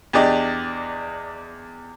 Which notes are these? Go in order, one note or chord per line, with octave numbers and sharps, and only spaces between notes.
E2 D4 G4 D5 D#5